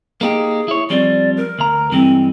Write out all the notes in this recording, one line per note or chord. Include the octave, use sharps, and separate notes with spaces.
A#3 D#4 G4 G#4
E4 C#5
F3 G3 C4 D5
A#4
D2 A#5
G2 E3 G#3 C4